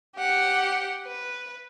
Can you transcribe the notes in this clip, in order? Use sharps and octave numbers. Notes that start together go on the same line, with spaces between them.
G4 F#5
B4